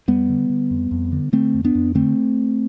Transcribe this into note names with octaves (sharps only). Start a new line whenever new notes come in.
F2 G3 B3
D3
D3
F2
F2
D3
D3 A3 C4
F2
B3 D4
F2
D3 A3 C4